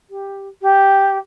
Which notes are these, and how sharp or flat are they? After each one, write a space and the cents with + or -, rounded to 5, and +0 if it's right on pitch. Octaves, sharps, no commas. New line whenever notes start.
G4 +5
G4 +0